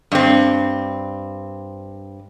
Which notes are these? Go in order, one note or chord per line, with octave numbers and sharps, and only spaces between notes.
G2 C4